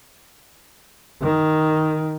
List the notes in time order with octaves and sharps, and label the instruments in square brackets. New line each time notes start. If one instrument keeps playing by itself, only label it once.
[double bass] D#3